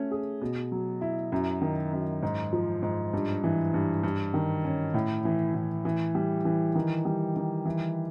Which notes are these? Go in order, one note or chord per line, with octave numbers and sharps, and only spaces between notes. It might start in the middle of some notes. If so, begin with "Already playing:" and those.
Already playing: A3 C#4
G#4
B2
F#3
E4
F#2
D#3
F#2
G#2
F3
G#2
G2
E3
G2
G2
D#3
C#4
A2
E3
A2
E3
G3
E3
D#3
G3
D#3
E3